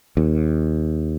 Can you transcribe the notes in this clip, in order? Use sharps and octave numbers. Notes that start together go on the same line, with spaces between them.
D#2